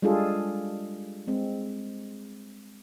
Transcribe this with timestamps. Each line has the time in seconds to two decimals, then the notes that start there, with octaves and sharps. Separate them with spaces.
0.02 G3 G#3 D4 F4 G#4 A4
1.28 G#3 C4